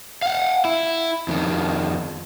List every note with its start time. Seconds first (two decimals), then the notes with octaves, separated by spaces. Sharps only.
0.22 F5 F#5
0.65 E4
1.28 F2 D#3